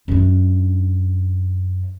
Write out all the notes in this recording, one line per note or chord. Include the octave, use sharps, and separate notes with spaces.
F#2 D4